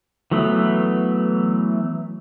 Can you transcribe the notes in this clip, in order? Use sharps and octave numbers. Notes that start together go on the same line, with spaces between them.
E3 F#3 A3 B3